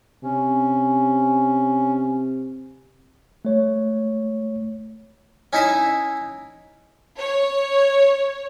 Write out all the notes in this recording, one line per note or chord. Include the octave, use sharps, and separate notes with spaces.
C3 C#4
A3 C#5
C#4 D#4 E4 E5 D#6
C#5